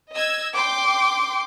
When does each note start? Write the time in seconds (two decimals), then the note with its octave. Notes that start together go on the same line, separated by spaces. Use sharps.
0.13 D#5 E6 G#6
0.55 G5 C6 D6